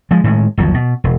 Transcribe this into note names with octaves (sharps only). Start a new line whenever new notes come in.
F3 G#3
A2 D#3 G#3
G1 D#2 F3 F#3
B2
E1